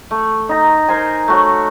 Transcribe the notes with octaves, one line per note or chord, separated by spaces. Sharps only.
A3
D#4 A#5
A#4 C5 G#5
A3 F#4 C#5